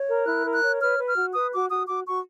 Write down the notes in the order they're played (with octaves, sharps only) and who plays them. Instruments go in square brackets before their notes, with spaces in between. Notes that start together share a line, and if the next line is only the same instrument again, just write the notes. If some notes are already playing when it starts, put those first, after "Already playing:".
Already playing: [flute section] C#5
A#4
E4 F#6
A#4
F#6
C#5
B4 F6
B4
F6
F#4
B4 D#6
F#4 D6
F#4 D#6
F#4 D6
F#4 C#6